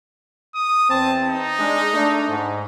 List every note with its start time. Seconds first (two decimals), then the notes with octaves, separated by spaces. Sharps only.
0.55 D#6
0.90 E2 C4 A5
1.27 D#4
1.59 G#3 D4
1.94 A3 D4
2.29 G#2